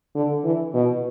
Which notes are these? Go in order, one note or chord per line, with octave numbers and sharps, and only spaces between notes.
D3
E3
B2